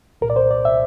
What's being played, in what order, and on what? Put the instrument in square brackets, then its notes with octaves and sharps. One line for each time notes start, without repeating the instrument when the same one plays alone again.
[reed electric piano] C2 A#2 A#4
D5
C5
D5
E5